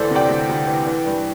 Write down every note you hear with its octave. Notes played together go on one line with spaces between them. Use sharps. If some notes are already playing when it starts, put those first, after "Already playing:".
Already playing: D2 E3 A4 C5 D5
C3 D5 G5
D2
D2
E3
E3
G2